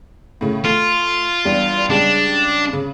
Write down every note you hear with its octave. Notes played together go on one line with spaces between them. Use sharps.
A2 C#3
A3 F4
E2 G3 D4
C#3 G3 G#3 D4
C#3